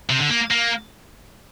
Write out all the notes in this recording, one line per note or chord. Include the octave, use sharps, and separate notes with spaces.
C3
D3
A#3
A#3